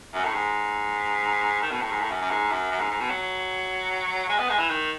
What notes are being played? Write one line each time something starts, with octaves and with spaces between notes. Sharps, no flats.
F#2
A2
G#2
D#3
B2
A2
G#2
A2
F#2
F#2
G#2
F#2
F#2
G#2
G#2
B2
F#3
G#3
B3
G#3
E3
D#3